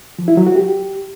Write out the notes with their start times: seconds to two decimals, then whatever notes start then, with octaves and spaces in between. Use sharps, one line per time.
0.19 F3
0.28 E4
0.37 F#3
0.47 F#4
0.56 G4